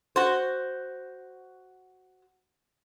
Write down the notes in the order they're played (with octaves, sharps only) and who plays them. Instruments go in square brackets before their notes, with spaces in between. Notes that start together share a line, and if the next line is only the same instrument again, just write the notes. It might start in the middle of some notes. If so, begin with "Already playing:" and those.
[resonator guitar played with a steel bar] F#4 C5